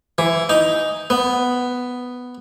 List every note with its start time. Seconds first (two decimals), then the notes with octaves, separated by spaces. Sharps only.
0.18 E3
0.49 D#4
1.10 B3